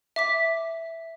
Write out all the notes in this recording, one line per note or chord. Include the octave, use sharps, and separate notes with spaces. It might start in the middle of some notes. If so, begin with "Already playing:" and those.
E5 D6 B6